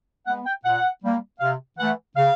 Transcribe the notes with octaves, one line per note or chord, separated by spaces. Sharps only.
G#3 B3 F#5
G5
A#2 F#5
G3 A#3
C3 F5
E3 A3 F#5
C#3 F5